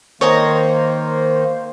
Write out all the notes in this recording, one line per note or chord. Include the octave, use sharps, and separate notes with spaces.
D#3 A#3 C5 C#5 D#5 A#5